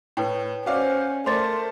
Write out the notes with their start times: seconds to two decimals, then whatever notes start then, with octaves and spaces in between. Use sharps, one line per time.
0.17 A2 B4 C#5 G5
0.66 C#4 F#4 C5 D5 F5
1.26 A3 A#4 C5 D5 C6 A6